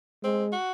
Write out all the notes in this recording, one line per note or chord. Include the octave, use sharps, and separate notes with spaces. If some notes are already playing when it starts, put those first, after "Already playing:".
G#3 C4
F#4